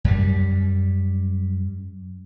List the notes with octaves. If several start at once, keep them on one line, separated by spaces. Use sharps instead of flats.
F#2 G3